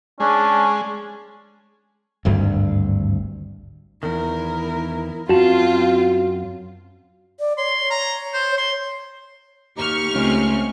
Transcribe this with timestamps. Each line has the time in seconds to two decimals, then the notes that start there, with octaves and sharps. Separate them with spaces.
0.20 G#3 C#4 D4
2.25 G#1 D2 G2
4.03 E2 D#3 E4 A#4
5.29 F#2 C4 F4 F#4 F5 A5
7.40 D5
7.58 C#5 C6
7.90 A#5
8.34 C5
8.58 C#5 C6
9.77 D#2 D#4 G4 C#6 F6
10.15 C#2 A3 C4 C#4